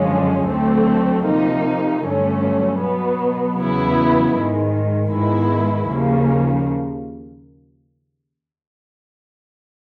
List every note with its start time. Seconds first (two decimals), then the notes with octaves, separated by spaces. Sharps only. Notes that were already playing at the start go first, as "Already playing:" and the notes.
Already playing: F#2 D3 F3 G#3 C#4
0.48 D2 D3 F#3 A3 C4
1.25 C3 F3 A#3 D#4
2.02 G2 D3 F#3 A3 C#4
2.80 B2 F#3 B3
3.57 E2 C#3 F#3 B3 E4
4.34 G#2 D#3 G#3
5.11 G#2 D#3 G#3 B3 E4
5.89 D#2 C#3 F3 A#3